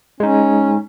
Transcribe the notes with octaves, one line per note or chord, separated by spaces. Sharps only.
G#3 C#4 D#4